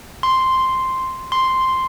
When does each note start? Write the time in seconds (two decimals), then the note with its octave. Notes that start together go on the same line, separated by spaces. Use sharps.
0.23 C6
1.32 C6